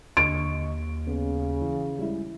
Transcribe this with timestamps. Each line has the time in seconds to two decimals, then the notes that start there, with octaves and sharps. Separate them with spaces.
0.17 D#2 D3 D#5 C#6 D7
1.07 C#3 B3
1.62 E3
1.99 G3 G#3 E4